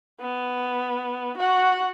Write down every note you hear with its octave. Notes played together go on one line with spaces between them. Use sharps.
B3
F#4 F#5